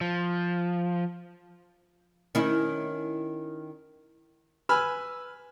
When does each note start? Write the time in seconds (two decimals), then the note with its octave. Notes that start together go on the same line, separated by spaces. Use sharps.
0.01 F3
2.35 D#3 C#4 E4
4.69 B4 G#5 B5 E6 F6